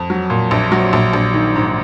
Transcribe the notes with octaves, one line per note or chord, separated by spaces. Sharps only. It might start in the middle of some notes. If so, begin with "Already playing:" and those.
Already playing: F2
F#3
A#2
A#1
F#3
A#1
A#1
D#3
G#2